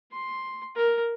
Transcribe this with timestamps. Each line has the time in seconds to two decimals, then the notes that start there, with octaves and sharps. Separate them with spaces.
0.12 C6
0.76 A#4